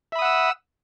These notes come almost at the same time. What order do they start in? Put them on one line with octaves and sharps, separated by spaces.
E5 B5 D#6 F#5 E6